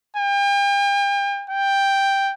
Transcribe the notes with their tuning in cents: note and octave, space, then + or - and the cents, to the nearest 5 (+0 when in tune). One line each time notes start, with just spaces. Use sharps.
G5 +40
G5 +5